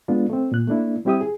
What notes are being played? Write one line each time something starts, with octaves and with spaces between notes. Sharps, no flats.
G#3 B3 D4 F4
A3 C4
A#2 F#6
A3 A#3 D4 E4
G3 C4 E4 G4 E5 D#6
G#4